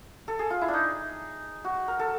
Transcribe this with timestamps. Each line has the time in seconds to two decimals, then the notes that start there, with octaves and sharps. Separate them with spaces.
0.28 A4
0.39 G#4
0.50 F4
0.61 E4
0.68 D4
0.74 D#4
1.64 F#4
1.88 A#4
1.99 A4